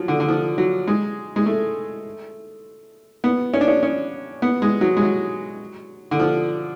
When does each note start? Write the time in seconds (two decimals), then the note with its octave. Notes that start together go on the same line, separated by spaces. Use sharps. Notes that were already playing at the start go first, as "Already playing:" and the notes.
Already playing: F3 F#3
0.08 D3
0.20 D3
0.28 F3
0.58 F#3
0.87 G#3
1.36 G#3
1.46 A3
3.24 B3
3.54 C#4
3.61 D4
3.68 C#4
3.83 C#4
4.42 B3
4.62 G#3
4.81 F#3
4.97 G#3
5.01 F#3
6.11 D3
6.20 F3